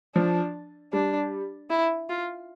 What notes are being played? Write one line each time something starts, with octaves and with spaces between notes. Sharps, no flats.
F3 D4
G3 D4
E4
F4